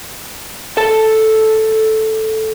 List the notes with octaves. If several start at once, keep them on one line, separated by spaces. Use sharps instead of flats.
A4 A5